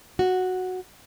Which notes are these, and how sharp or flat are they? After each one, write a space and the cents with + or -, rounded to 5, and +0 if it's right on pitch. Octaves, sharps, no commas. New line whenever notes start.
F#4 -5